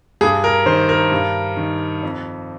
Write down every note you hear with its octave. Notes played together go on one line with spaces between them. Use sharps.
G2 G#4
A#4
D#3 C5
A#4
G2
D#3
F2